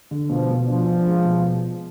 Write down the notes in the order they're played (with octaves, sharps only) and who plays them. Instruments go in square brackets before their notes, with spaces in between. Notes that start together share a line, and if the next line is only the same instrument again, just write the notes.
[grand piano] D3
[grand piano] B2 [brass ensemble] F3
[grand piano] B2
[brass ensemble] F3 [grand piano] D4
[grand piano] D4
G#3
B2